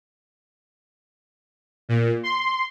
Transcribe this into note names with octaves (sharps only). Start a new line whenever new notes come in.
A#2
C6